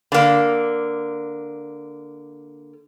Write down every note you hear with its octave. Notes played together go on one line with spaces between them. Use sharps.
D3 A#3